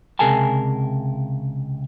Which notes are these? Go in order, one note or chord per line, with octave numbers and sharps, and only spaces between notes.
C#2 C3 G#4 A#4 G#5 A5